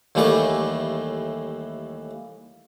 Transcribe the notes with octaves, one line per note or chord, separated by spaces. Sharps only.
D#2 A2 E3 G3 C#6 D6